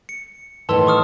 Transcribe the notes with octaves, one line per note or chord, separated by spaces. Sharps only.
C#7
D#2 A2 E3 A5 C6 E6
C#6 D#6 F6